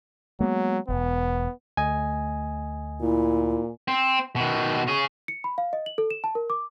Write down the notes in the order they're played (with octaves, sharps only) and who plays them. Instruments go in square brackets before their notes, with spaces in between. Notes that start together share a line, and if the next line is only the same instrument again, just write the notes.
[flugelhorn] F#3 [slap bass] G#3 A#3 B3
[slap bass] E1 [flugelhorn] B3
[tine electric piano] D2 A3 D#5 [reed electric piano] G#5
[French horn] A#2 [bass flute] E4
[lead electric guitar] C4
B2 D#3
C#4 G#4
[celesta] C#7
B5
F5
D#5
F#7
A4
E7
A5
A#4
D6